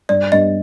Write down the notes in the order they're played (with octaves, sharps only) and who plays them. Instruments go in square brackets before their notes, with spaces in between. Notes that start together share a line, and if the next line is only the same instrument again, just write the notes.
[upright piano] G2 [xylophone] D5
[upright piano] G2 [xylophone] D#5